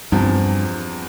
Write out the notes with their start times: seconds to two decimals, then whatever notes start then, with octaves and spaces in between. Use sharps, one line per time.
0.12 E2 G2 C3 F3